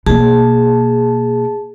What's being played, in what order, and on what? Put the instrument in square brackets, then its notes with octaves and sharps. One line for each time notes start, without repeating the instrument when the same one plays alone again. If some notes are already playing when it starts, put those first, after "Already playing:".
[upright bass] B2 A#3 [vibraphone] G#4 A5